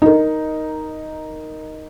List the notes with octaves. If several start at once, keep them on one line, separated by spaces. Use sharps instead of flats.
D#4 A#4